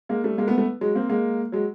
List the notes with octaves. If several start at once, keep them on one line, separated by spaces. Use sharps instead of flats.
G#3 A#3
G3 A3
G#3 A#3
A3 B3
A3 B3
F#3 G#3
A#3 C4
G#3 A#3
F#3 G#3